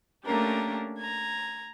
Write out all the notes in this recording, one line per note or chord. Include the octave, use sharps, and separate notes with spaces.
A3 A#3 C#4 D4 G4 A#4
A#5 G#6